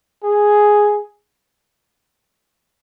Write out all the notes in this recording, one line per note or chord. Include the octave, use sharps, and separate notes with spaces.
G#4